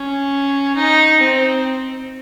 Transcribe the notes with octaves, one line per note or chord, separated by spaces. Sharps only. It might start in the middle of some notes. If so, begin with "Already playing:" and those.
Already playing: C#4
D#4
C4